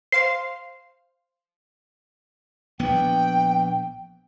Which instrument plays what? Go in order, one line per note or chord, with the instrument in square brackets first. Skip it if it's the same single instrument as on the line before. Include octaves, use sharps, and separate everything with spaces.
[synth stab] C5 F5 C6 [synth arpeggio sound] C7
[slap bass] A#1 B3 [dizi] G5